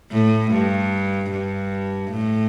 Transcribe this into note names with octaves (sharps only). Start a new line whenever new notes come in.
A2
G2
G2
A2